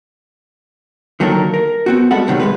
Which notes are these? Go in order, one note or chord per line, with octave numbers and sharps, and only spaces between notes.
D3 D#3 F#3 A#3 A4 A#4
A#4
B3 C4 F#4
G3 G#3 B3 F#4 A4 F#5
A2 C3 D#3 F#3 G3
C2 G#3 B4